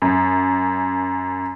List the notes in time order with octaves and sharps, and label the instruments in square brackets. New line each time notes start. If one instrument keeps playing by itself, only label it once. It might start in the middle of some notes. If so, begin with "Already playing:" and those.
[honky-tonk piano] F#2